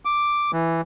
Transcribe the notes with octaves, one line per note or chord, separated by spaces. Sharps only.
D6
E3